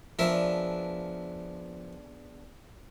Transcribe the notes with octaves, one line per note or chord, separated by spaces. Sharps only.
F3 B3 D4 G#4 A#4 E5